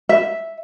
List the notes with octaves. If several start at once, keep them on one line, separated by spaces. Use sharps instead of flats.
E5